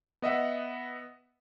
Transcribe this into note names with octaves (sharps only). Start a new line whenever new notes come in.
B3 D#5 E5 F#5